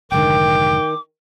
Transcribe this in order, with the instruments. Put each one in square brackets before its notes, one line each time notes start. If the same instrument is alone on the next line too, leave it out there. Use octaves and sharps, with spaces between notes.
[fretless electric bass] F1 G#2 D3 [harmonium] D#3 [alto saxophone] G5 [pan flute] D6